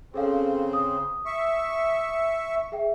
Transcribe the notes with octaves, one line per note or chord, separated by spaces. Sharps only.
C#3 C4 G#4 A4 F5
D#6
E5 C#6
G#4 E5 G5